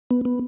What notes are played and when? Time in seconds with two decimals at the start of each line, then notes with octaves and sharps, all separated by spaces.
0.11 B3
0.25 B3